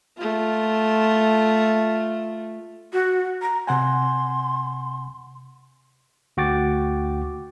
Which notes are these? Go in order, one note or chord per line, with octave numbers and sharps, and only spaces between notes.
A3 F4
F#4
A#5
C3 F#5 G#5 C6
D2 F#4 G5 D6 A6